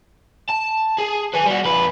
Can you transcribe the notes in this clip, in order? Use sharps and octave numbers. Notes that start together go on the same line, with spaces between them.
A5
G#4
B4 G#5
G3 F#4
F2 B4